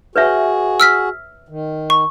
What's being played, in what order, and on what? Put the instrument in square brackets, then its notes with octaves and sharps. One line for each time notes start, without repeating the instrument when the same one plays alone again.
[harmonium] F#4 G#4 [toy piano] B4 C#5 E5
[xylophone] E6 F6 B6
[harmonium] D#3
[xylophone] C#6